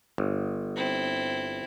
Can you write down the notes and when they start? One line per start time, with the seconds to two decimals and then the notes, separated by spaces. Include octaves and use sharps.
0.18 G1
0.76 C4 E4